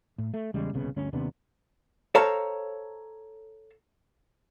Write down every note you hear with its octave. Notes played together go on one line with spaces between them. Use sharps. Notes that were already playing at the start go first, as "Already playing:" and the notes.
A2
A3
E2 C#3 G3 G#3
D#1 C2 C#3 B3
G1 D2 C#4
D#2 C3 B3 D4
A4 C5 C#5 F5 A5 A#5